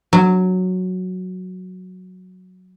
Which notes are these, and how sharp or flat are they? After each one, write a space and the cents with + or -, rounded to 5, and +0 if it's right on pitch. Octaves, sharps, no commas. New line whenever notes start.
F#3 -5